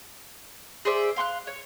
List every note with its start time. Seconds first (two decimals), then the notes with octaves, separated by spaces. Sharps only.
0.85 G#4 C5 D5 E5
1.16 F5 C6 C#6 F#6
1.47 C#5